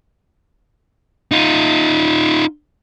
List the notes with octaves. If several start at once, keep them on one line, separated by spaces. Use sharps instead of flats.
D#4 F4